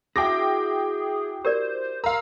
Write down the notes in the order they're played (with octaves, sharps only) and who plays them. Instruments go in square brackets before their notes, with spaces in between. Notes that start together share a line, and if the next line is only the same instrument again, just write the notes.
[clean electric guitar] E4 F#4 E5 [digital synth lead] G#4 [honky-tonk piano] G5 D6 A#6
[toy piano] G4 A#4 D5 [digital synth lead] C5
[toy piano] A#4 C6 [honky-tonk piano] F5 A#5 [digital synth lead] E6